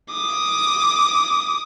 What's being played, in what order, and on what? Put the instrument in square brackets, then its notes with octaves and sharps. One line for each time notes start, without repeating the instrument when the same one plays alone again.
[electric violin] D6 D#6